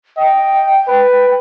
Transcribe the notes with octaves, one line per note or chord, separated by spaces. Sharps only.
D#5 G5
B4